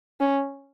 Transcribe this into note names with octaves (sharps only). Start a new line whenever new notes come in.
C#4